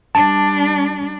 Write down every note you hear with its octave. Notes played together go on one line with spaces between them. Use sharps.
G3 D4 A5